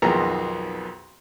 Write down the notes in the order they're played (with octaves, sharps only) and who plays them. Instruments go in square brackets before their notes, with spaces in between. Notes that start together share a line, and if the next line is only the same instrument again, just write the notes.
[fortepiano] B1 F2 D#3 B3 G#4 A#5